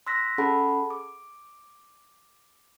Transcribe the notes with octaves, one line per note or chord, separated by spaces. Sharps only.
C6 E6 F#6 A#6 B6
C#4 G#4 A4 F#5 A5 B5
D6